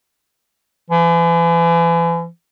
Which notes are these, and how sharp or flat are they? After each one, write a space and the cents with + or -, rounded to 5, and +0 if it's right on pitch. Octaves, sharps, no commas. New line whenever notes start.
E3 +40